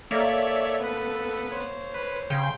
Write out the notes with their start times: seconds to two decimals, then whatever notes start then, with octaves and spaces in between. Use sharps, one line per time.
0.11 A#3 A4 C#5 D5 E5
0.80 B3 B4
1.51 C5 C#5
1.94 B4
2.30 C#3 G5 C6